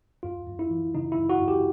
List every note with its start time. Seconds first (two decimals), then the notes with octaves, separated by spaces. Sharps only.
0.23 F#2 F4
0.47 F#2
0.59 E4
0.71 E3
0.95 C#3 D#4
1.12 E4
1.19 F#2
1.29 F#4
1.41 F#2
1.48 G4